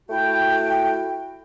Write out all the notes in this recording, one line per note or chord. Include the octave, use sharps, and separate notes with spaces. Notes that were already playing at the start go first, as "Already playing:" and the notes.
A3 E4 F#4 G5